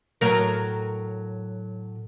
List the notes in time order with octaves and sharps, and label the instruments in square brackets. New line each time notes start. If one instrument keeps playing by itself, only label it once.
[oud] A2 F#3 A#4